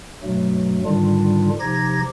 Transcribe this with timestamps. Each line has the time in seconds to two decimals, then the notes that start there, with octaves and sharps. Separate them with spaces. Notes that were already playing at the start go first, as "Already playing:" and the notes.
0.23 G2 B2 F#3 A3
0.85 G#2 D3 D#3 G3 D4 F4
1.60 C3 F3 D#4 G4 G#6 A#6